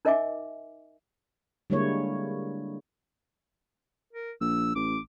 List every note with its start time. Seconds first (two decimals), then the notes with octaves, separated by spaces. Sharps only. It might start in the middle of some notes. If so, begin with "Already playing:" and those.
0.05 D#4 A#4 D#5 E5 G#5 D6
1.70 D3 G3 G#3 A#3 E4 C#5
4.13 A#4
4.41 A#1 E6
4.76 A1 D6